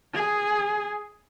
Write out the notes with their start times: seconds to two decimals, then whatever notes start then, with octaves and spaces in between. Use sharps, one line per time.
0.15 G#4